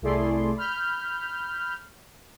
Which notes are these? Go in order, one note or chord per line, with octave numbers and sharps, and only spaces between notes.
C2 A3 E4 G#4 D5 C6
B5 F6 G6